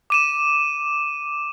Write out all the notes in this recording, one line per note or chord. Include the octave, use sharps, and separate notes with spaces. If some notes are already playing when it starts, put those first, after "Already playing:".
D6 D#7 E7